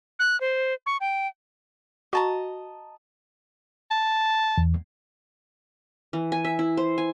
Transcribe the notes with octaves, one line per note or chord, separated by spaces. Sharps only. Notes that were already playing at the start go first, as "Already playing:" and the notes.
F#6
C5
C#6
G5
F#4 D#5 A5 A#5
A5
E2
E3
G#5
E5
E4
C5
G#5